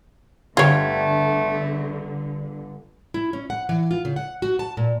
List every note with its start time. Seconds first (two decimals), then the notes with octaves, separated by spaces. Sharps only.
0.57 G1 D3 A3 F4 G4 C#5 G#6
3.14 E4
3.33 C#4
3.50 F#5
3.69 E3
3.91 F4
4.05 C#3
4.16 F#5
4.42 F#4
4.59 A5
4.77 A#2